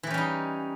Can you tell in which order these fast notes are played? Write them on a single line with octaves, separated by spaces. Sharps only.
E3 G4 C#4 G3 D#4